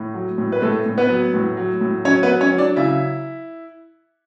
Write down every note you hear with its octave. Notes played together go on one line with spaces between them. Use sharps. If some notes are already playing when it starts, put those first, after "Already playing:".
Already playing: A2
F#3
A2
B4
A2 A3 A4
A2
B3 B4
F#3
A2
F#3
A2
F#3 C#4 C#5
B3 B4
F#3
C#4 C#5
F#3
D4 D5
C#3 E4 E5